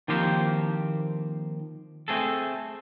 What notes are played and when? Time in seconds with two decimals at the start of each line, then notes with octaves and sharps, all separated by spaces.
0.08 D#3 F3 A#3 C4 G4 C5
2.08 A3 C4 G#4 A4